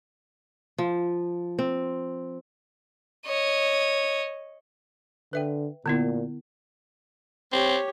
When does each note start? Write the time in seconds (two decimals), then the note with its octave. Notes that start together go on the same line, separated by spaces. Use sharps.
0.78 F3
1.59 C4
3.27 C#5 D#5
5.33 D3 B4 E5 G5
5.86 A#2 D3 B3 E4
7.52 C4 G4 C#5